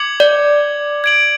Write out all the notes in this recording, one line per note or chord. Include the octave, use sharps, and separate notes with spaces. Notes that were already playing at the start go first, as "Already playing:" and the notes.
Already playing: D6 G#6 C#7 F#7
D5
G#6 D7 F#7